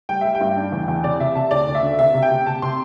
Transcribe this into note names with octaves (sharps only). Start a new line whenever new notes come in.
G3 G5
G3 E5
G5
G2
D4
E2
E2
C3 D5
C3 E5
C3 A5
D2 D5
D2
E5
D3
C3 E5
C3
G5
C3
C3 A5
C3 C6